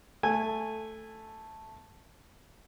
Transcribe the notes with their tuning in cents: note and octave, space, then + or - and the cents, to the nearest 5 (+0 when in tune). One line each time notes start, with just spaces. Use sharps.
A3 +0 G#5 -15